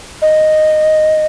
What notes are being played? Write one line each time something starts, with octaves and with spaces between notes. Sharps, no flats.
D#5